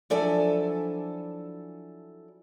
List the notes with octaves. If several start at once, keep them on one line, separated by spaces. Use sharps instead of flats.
F3 F#3 D4 E4 A4 G#5